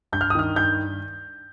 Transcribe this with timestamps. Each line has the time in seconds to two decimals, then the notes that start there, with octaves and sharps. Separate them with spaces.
0.13 G2 G6
0.21 F6
0.30 D#6
0.35 D#3 F6
0.56 G2 G6